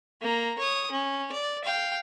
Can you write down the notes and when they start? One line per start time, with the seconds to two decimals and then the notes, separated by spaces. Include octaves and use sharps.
0.21 A#3 A#5
0.58 C#5 D#6
0.91 C#4
1.32 D5
1.64 F5 G5